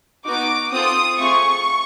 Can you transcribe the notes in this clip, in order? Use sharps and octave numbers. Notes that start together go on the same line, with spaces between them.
B3 D#4 F#4 D6
C4 F4 A4 D#6
A3 C4 F4 G#4 C#6